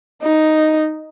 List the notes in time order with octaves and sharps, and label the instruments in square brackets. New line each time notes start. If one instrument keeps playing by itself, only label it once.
[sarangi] D#4